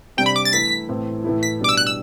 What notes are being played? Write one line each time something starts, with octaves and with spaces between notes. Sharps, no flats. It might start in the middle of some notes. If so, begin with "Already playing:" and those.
C3 G3 D4 G5
B5
D6
A6
E3 A3 E4 B6
A2 E3 A3 C4
A2 E3 A3 E4
B6
B2 G3 D4 D6
E6
F#6
E6